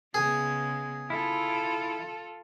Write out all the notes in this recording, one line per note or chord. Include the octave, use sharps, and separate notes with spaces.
C#3 G#3 B3 G#4
E4 F4 A4